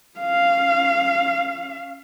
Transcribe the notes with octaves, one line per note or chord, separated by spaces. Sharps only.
C#4 F5